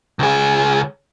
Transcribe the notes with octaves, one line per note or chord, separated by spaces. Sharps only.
C#2 G#4